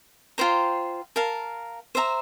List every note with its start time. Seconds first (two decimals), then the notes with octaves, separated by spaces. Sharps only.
0.38 F4 C5 G5 A#5
1.16 A#4 F5 A5
1.95 C5 E5 A#5